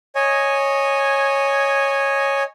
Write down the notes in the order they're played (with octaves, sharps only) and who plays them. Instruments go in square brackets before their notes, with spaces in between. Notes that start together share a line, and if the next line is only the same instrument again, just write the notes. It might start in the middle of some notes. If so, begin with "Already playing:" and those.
[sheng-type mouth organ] C#5 D#5 G#5